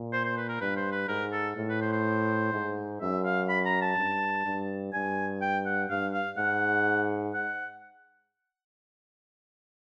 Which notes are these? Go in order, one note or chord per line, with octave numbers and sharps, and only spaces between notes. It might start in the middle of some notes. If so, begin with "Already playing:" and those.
Already playing: A#2
C5
C5
B4
A#4
G2 B4
C5
B4
G#2 A#4
A4
A2
B4
C5
C5
G#2
F#2 E5
F5
B5
A#5
A5
G2
G2
G2 G#5
G5
F#5
G2 F5
F5
G#2 F#5
F#5